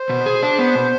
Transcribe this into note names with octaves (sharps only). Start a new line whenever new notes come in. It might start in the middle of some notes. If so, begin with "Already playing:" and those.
Already playing: C5
B2
G#4
D4
B3
B2